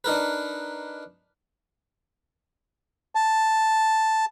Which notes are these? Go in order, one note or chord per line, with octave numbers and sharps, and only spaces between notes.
D4 D#4 A#4 B4
A5